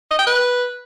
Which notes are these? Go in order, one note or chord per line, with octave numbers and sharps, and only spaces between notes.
D#5
G5
B4